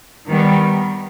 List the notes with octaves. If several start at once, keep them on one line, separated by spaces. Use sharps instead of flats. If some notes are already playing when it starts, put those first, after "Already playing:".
D#3 G3 B3